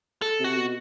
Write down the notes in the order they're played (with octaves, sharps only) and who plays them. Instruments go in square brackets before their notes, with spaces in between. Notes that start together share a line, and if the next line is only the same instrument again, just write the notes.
[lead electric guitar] A4
[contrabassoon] C3 [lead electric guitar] F#4
[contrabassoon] B2